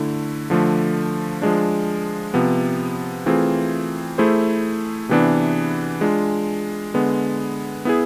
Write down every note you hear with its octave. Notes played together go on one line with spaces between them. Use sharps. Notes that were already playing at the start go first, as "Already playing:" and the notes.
Already playing: D3 A3 E4
D3 F3 A3
F3 G#3 D4
C3 F3 B3
E3 A3 C4 F4 G#4
A3 E4 G#4 C5
C3 E3 B3 D4
G#3 D4 F4
D3 G#3 B3
B3 E4 G#4